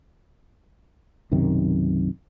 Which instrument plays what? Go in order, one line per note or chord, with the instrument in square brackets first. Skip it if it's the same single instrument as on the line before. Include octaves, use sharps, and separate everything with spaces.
[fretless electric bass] B1 F#2 C3 D#3